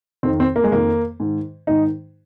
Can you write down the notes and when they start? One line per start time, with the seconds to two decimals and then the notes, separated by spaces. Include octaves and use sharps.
0.23 F2 D#3 C4
0.40 C4
0.56 A#3
0.64 G#3
0.71 F2 D#3 A#3
1.20 G#2 D#3
1.67 G#2 D#3 D#4